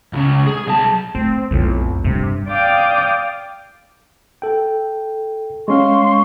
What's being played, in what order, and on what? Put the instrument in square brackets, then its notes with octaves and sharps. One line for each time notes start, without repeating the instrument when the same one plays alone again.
[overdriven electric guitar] C#2 C#3
G#4
B1 A5
[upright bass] A3 [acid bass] C4
[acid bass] B1 [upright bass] F2 A2
[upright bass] G2 [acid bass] C3
[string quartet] D5 F5 G5 D6 D#6
[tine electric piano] A4 G5
[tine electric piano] G#3 C#4 F5 [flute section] C6 C#6